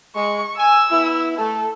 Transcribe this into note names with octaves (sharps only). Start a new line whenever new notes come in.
G#3 C#6
G#5 E6
B3 E4
A3 A4